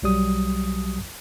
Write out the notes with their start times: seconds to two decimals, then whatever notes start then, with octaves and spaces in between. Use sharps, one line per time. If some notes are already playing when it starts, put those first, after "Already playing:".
0.02 B1 F#3 G3 D#6